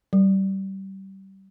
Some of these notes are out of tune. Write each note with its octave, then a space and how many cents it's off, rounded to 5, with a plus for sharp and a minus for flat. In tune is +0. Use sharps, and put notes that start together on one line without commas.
G3 -25